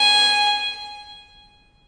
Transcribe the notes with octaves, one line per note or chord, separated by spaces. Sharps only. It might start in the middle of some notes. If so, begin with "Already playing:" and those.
Already playing: G#5